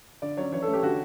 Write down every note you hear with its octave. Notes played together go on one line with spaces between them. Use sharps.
D3 D5
F#3 C#4 C#5
E3 C#5
A4
A3 C#4
G4
D3 F#4